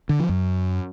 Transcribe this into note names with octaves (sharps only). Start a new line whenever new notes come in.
D3
F3
F#2